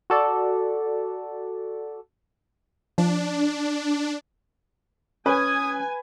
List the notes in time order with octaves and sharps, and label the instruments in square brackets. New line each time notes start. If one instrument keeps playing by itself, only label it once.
[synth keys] F#4 A4 D5
[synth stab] F3 [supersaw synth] D4
[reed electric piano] C#4 [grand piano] B4 [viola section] G#5 [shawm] D#6